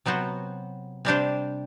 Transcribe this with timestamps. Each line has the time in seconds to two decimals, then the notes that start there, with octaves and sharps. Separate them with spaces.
0.06 C3 F#3 B3 F#4 C5
1.05 C3 G3 D4 G4 C5